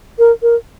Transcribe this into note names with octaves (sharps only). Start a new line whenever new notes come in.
A#4
A#4